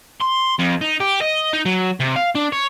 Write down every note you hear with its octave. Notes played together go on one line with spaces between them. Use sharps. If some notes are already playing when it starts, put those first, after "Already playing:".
C6
F2
D#4
G4
D#5
D#4
F#3
C3
F5
D4
C#5